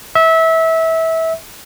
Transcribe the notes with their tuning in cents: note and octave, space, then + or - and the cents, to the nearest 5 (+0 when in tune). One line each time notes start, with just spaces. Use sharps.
E5 -20